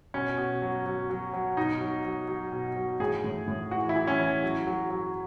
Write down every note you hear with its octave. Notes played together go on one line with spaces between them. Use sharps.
B2 C#4
B2
F#3
F#3
F#3
F#3
B2 D#4
F#3
F#3
F#3
B2
F#3
A2 G#4
A2
A2
E3 F#4
E4
E3
C#4
E3
F#3
F#3
F#3